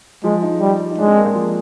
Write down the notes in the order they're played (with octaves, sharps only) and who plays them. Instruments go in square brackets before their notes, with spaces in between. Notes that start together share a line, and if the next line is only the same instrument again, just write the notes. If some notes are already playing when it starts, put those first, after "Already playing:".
[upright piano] F3 [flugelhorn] G#3
[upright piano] D#4
[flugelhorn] G3
[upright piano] D#4
[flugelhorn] G#3 [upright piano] D4
[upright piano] C4
A#3
G#3
F3